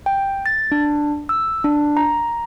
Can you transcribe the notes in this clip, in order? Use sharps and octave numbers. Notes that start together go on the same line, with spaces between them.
G5
A6
D4
E6
D4
A#5